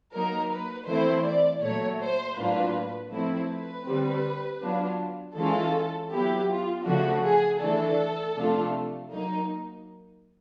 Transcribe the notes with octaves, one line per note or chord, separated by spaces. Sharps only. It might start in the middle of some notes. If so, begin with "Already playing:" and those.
F#3 A#3 D#4 A#4
B4
E3 A3 C4 E4 C5
D5
A#2 F#3 A3 C#5
C5
A2 F#3 A#3 D4 F4 B4
F3 A3 C4 E4
B4
D3 G3 C4
F#3 B3 D4 F4
E3 G#3 C#4 F4 A4
F#3 B3 E4 G4
F4
C#3 F3 A3 D4 F#4
G#4
E3 A3 D4 A4
C3 F3 A3 D4 F4
F#3 A#3 D#4